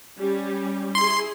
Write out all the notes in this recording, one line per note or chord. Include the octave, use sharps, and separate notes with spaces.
G3 C#4 G4
E4 G#4 C6